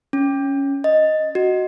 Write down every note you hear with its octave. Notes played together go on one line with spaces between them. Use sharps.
C#4
D#5
F#4